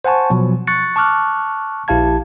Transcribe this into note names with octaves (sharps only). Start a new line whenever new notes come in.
C5 F#5 G#5 A5 C#6
B2 F3 F#3
C#6 F#6 A6 C#7
A5 C#6 D6 F6 F#6
A#1 E4 G4 F5 A5 G#6